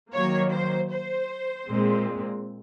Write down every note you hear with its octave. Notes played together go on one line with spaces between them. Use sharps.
D#3 F#3 A#3 C#5
C5
C5
A#2 G#3 C4